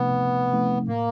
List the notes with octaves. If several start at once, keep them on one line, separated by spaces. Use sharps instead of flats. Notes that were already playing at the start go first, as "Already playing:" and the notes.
Already playing: C3 F3 A3 B3 C4 D#4
C3
F3 A3 C4 D#4
A2 A#3